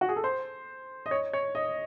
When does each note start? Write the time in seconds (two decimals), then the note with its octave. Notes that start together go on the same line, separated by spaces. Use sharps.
0.01 F#4
0.09 G#4
0.16 A4
0.24 C5
1.06 D#5
1.11 C#5
1.33 C#5
1.55 D#5